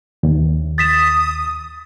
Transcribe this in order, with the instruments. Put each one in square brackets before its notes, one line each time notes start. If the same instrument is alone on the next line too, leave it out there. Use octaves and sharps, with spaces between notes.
[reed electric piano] D#2
[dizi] D#6 [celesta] A6 B6 E7